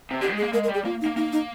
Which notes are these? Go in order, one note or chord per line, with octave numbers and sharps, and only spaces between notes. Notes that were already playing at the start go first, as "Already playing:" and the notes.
C3
D3 G4
G#3
G#4
A#3
G#3 A#4
A#4
G3
G#4
A#3 F4
D#4
A#3
A#3 D#4
D#4